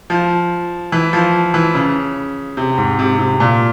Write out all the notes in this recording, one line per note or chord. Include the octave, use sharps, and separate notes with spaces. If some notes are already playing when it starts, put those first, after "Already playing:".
F3
E3
F3
E3
C#3
C3
G#2
C3
C3
A#2